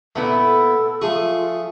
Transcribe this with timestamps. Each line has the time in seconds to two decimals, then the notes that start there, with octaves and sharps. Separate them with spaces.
0.16 A#2 A3 B3 E4
0.40 A4
1.02 F3 A3 F4 G#4 C#6